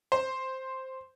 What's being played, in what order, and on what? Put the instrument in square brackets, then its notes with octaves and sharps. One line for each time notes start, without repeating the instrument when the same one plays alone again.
[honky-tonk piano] C5